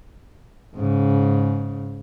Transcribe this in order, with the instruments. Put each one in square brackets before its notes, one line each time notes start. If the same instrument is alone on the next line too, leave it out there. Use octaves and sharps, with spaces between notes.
[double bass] G#2 C#3